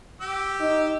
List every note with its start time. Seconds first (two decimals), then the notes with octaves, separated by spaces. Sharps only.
0.21 G4 E6
0.60 D#4